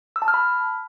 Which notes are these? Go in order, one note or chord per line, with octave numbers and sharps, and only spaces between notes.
E6
A5
F6
B5